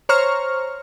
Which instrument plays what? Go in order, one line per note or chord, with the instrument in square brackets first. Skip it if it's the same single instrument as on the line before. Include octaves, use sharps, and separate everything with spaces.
[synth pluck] C5 C#5 A#5 C#6 F6